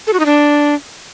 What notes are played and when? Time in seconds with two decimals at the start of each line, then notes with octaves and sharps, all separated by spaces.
0.07 A4
0.13 F#4
0.19 D#4
0.26 D4